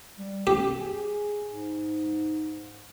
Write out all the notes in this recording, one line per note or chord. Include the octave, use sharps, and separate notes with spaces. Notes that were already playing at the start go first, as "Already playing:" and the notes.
G3
F#2 G4
G#4
G#2